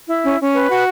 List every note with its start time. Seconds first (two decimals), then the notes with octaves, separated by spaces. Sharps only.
0.08 E4
0.24 C#4
0.39 C#4
0.54 B4
0.69 F#4